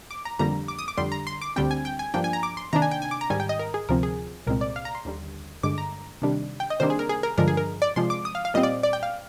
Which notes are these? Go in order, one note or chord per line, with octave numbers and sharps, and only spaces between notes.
D6
A#5
F2 D3 G3 A#3 A#5
D6
D#6
D6
F2 D3 G3 C6
A#5
C6
D6
D2 D3 G3 C4 G5
G#5
G5
G#5
G2 F3 A#3 D4 G5
G#5
A#5
D6
C6
C3 D#3 A#3 D4 A#5
G#5
G5
G#5
D6
A#5
G#2 D#3 G3 G#5
G5
D#5
A#4
G#4
D2 C3 F3 C4 A#4
G#4
C2 A#2 G#3 C4 A#4
D5
F5
A#5
C6
D#2 D3 G3
G2 D3 G#3 D6
A#5
C3 D#3 G3 D4
G5
D#5
C3 D#3 G3 A#3 D4 C5
G#4
A#4
G#4
A#4
G2 D3 F3 G#3 A#4
G#4
A#4
D5
C3 F3 G#3 C6
D6
D#6
F5
F5
A#2 G3 C4 D#5
D5
D5
G5
F5